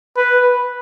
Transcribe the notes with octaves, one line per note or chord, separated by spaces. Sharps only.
B4